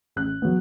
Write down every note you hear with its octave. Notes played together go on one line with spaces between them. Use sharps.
A1 F#6
F#3 B3